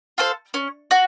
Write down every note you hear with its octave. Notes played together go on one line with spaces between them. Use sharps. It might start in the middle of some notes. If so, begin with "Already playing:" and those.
F4 A4 C5
C#4
F#4